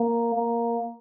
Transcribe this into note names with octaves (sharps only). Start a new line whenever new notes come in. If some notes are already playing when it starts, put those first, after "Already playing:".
Already playing: A#3
A#3